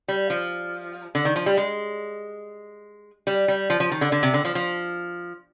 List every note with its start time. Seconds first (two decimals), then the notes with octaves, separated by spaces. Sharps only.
0.08 G3
0.30 F3
1.15 D3
1.25 D#3
1.36 F3
1.46 G3
1.57 G#3
3.27 G3
3.48 G3
3.70 F3
3.80 F3
3.92 D#3
4.01 D3
4.12 D3
4.23 C3
4.34 D3
4.45 F3
4.55 F3